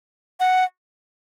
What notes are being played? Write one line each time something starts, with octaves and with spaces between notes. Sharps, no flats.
F#5